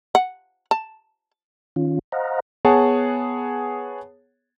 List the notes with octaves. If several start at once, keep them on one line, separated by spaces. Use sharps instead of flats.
F#5
A5
D#3 C#4 F4
C5 D#5 F5 F#5 A#5
B3 G#4 C#5 F#5 A5